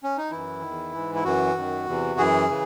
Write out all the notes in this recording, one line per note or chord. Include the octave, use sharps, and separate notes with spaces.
C#4
D#4
F#2 E3 E4
E2 D#3
G#2 E3
E4
F#2 E3 F#4
F#2 D#3
E2 C3 E3
F#2 E3 G#4
C#3 E3